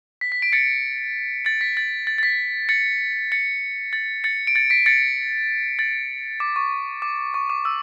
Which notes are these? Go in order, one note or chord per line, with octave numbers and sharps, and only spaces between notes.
B6
B6
B6 D7
A6 C#7
A6 C#7
B6
A6
A6
A6
B6
A6 C#7
A6 C#7
A6
A6 C#7
D7
A6 C#7
B6 D7
A6 C#7
A6
D6
C#6
D6
C#6
D6
E6